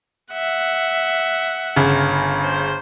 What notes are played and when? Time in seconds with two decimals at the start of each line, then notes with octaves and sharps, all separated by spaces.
0.33 E5 F#5
1.76 G1 C#3
2.44 C5